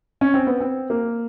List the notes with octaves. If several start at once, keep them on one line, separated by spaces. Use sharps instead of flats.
C#4
C4
B3
C4
A#3